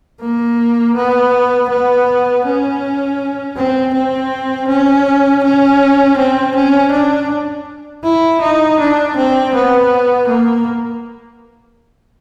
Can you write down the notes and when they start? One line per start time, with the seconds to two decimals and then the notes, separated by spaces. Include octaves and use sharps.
0.20 A#3
0.96 B3
1.69 B3
2.45 C#4
3.57 C4
3.94 C4
4.68 C#4
5.44 C#4
6.17 C4
6.55 C#4
6.92 D4
8.04 E4
8.41 D#4
8.80 D4
9.16 C4
9.54 B3
10.28 A#3